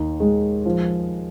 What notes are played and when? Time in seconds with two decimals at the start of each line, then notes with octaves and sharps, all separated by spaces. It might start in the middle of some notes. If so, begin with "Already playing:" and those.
Already playing: D#2 D#4
0.20 G#3
0.66 F3